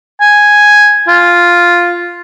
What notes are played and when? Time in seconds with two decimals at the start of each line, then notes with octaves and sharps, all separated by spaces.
0.21 G#5
1.08 F4